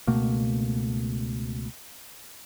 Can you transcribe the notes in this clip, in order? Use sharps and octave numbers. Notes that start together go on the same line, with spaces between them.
C#2 B2 A3 A#3